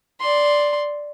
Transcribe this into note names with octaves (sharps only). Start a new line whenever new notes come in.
D5 C6